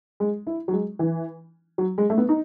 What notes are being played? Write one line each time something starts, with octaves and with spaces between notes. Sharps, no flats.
G#3
E4
F#3
G#3
E3
F#3
G#3
A3
B3
D#4